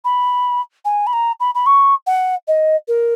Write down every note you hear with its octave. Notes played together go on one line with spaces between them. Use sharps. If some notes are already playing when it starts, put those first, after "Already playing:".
B5
G#5
B5
A#5
B5
B5
C#6
F#5
D#5
A#4